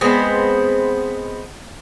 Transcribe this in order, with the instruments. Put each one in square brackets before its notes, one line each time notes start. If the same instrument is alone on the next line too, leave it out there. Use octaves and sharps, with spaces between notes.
[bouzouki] G#3 B3 C4